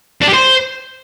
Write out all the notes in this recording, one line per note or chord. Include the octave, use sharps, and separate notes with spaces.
D4
G4
C5